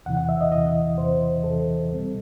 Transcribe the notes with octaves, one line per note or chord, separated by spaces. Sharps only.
E2 C3 E3 F#5
F#5
E5
D#5
E2 C3 E3 D#5
E2 C3 E3 C5
E2 C3 E3 A4
C2 B2 G3 C4